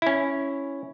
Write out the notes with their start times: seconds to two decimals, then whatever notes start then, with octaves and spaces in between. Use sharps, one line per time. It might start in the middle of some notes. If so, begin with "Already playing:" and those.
0.02 C#4 E4